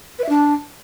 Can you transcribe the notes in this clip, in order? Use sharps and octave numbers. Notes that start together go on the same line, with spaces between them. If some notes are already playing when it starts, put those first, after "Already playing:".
B4
E5
D4